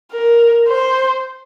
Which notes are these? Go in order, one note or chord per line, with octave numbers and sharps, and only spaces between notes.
A#4
C5